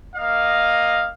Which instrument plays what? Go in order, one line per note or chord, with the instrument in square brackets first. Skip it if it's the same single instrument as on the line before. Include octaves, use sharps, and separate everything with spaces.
[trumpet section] A#3 D#5 F5